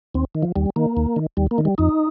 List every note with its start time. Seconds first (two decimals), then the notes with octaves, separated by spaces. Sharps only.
0.15 D#2 C4
0.35 D#3
0.42 F3
0.56 D#2 G3
0.76 D#3 A#3
0.97 D#2
1.16 D#3
1.37 D#2 G3
1.51 A#3
1.58 D#3
1.65 G3
1.78 F2 D#4